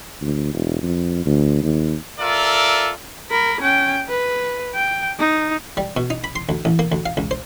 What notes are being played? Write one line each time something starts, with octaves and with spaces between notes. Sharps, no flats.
D2
E1
F2
D2
D#2
F4 A4 A#4 D5 E5
A#4 B5
C#4 G5
B4
G5
D#4
G3
B2
D#4
B5
C6
D2
A1
A#3
D2
F5
C#2
C5